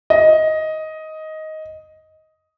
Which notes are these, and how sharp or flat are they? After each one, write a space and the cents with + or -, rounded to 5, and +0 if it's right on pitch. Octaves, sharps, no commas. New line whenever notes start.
D#5 +10